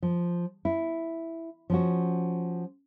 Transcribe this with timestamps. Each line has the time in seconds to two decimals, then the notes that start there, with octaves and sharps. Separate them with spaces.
0.02 F3
0.65 E4
1.70 F3 C#4 F#4